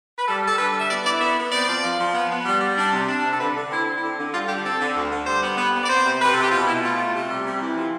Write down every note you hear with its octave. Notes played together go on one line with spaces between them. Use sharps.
B4
G3 A4
G3 A4
D3 B4
G3
E5
B3 D5
E4 D5
B3 E5
B3
C4 D5
F3
F3
F3
B3
B3
G3
G3
D4
C3
D4
C3
A4
D3 B4
D3
C4 E4
C4
D3 E4
D3
G3 F4
D3 G4
C4 A4
D3
D2
D3
G3 C5
B3
B3
B3
D5
C4 C5
C3
C3 B4
C4 A4
G4
B2 F4
B2 E4
A3 F4
A3
C3
G3
C3
E3
F3